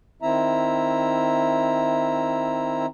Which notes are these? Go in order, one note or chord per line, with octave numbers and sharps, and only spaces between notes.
D#3 C4 E4 E5 A#5